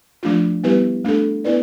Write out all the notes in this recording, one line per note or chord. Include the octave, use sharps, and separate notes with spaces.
F3 A3 D4 F4
G3 B3 E4 G4 B4
A3 D4 A4
B3 E4 B4 D5